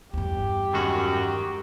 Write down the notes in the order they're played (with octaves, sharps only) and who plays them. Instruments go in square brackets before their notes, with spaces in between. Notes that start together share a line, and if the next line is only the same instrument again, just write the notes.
[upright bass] E2 G2 [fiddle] G4
[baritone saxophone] F#2 [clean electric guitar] D#3 G#3 F#4